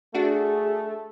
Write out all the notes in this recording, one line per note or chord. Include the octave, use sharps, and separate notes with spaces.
A3 D4 F#4 G#4